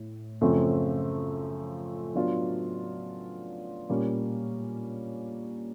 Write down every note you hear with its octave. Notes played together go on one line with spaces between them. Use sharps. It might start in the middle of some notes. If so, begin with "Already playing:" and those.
Already playing: A2
F#2 C#3 F3 A3 C4
F#3 B3 D4 F4
A#2 G3 A#3 C#4